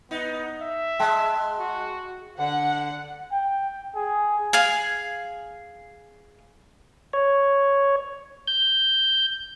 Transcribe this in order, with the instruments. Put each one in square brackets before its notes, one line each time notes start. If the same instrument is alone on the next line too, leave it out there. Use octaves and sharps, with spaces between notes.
[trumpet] B3 [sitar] D#4
[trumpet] E5
[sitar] G#3 [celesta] G5 A5
[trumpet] F#4
[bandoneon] D3 [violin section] F#5
[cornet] G5
G#4
[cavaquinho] G#4 F5 G#5
[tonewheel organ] C#5
G6